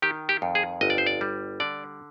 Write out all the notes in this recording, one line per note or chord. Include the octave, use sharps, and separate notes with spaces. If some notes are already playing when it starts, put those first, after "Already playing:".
D#3 G4
G4
F2
G#4
G1 D#5
D5
C5
D5
G3
D3 D5